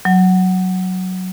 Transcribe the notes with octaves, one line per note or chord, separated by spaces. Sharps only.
F#3